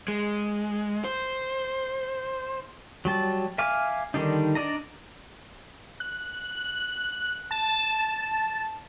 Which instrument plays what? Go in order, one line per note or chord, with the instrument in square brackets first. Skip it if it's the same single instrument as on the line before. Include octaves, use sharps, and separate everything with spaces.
[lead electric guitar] G#3
C5
[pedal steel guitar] F#3 G3 A5
E5 F5 G#5 D6 F6
D3 D#3 G3 D4 D#4
D4 D5 D#5 A#5
[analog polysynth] F#6
A5